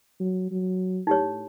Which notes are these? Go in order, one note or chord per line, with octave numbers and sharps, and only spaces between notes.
F#3
F#3
A2 D#4 G4 C#5